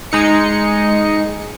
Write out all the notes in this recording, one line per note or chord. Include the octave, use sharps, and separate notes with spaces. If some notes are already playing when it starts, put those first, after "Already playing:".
G#3 D#4 C#7